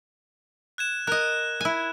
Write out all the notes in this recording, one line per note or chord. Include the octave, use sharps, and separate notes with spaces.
F#6 G#6 E7
A#4 D#5 F#6
E4 G#5